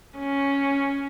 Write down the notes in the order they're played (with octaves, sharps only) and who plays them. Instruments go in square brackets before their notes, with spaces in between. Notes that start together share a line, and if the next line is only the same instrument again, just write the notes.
[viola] C#4